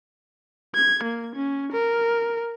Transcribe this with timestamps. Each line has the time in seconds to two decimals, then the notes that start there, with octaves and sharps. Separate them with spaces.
0.75 G#6
1.04 A#3
1.36 C#4
1.72 A#4